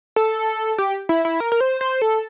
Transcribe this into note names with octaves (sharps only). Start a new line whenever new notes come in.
A4
G4
E4
E4
A#4
A#4
C5
C5
A4